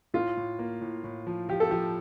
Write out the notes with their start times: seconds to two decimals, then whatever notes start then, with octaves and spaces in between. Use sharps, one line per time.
0.14 A2 F4
0.37 A2
0.59 A#3
0.81 A2
1.04 A2
1.27 F3
1.49 F3 G4
1.60 A4
1.71 F3 G4